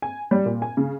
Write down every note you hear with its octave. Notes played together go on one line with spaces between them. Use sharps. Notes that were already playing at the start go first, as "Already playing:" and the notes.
G#5
G3
A#2
G#5
C#3